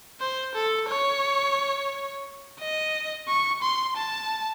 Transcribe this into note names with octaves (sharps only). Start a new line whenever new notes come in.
C5
A4
C#5
D#5
C#6
C6
A5